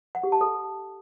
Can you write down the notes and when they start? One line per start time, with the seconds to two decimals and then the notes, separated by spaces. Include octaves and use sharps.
0.15 F#5
0.24 G4
0.32 A5
0.41 A4